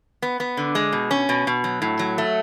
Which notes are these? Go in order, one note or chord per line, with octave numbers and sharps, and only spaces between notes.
B3
B3
D3
G#3
B2
C#4
B2
B2
F#3
A2
F#3
A3